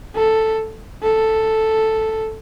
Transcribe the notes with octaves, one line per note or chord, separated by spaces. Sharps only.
A4
A4